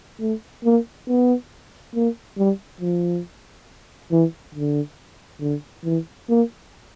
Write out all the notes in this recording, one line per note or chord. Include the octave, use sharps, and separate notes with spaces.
A3
A#3
B3
A#3
G3
F3
E3
D3
D3
E3
A#3